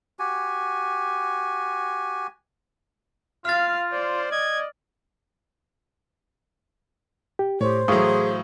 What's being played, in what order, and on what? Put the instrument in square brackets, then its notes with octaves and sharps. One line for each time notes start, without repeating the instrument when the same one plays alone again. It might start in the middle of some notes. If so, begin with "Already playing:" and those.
[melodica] F#4 G4 G#5
[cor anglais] F4 [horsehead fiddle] F5 [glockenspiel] F6 A6
[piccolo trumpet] C5 [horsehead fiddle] D5
[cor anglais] D#5 [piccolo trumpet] G#6
[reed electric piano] G4
[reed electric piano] A2 [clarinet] G4 [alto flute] C5 [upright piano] C#5
[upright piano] A2 E3 F#3 [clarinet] G#4 [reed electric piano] F5 C#6 D#6